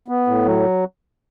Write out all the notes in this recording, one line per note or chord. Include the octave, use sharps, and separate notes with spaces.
B3
A2
F#3